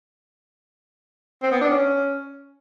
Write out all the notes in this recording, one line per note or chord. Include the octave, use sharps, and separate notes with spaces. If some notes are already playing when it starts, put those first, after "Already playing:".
C4
B3
D4
C#4